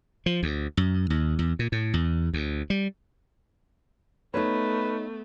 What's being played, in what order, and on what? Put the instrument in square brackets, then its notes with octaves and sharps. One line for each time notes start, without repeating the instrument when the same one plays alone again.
[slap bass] F3
D2
F#2
D#2
E2
A#2
A2
E2
D2
G3
[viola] A3 B3 [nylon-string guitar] D#4 C#5 [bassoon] B4